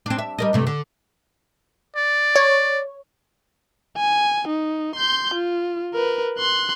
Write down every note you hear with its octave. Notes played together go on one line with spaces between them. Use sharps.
C4 D4
E5
G3 A#4 D#5
G2 C3 A3
D3
D5
C#5
G#5
D#4
C6 G6
F4
A#4 B4
C6 F#6